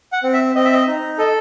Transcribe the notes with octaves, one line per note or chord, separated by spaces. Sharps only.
F#5
C4
E5
C4 D#5
E5
D#5
D#4
A4 D#5